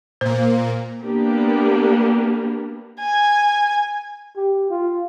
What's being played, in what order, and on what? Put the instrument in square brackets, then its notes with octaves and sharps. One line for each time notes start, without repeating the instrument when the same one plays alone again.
[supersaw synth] A#2 A#3 [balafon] C5
[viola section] A#3 B3 D4 G4
[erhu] G#5
[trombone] G4
F4